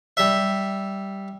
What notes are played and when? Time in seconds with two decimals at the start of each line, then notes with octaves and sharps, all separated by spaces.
0.17 G3 E5